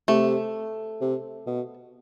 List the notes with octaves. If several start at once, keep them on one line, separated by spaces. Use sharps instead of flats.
C3 A3
C3
B2